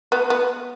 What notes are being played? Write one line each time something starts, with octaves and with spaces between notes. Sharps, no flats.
B3
B3